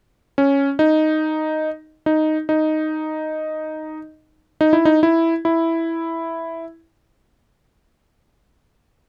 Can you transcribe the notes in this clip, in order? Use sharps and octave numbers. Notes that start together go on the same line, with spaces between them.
C#4
D#4
D#4
D#4
D#4
E4
D#4
E4
E4